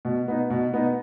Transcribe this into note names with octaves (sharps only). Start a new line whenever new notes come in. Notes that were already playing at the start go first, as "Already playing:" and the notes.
B2
B3 D#4
B2
B3 D#4